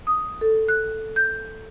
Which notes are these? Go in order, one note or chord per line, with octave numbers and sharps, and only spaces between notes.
D#6
A4
F#6
G6